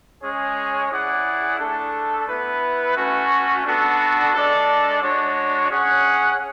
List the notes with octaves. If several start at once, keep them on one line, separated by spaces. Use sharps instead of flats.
G#3 C#4 G#4 C#5
E4 G#4 D5 F#5
A3 D4 A4
B3 E4 B4
A3 C#4 F#4
B3 D4 F#4 A4
G#3 D4 A4 D5
G#3 D4 F#4 C#5
C#4 G#4 C#5 F#5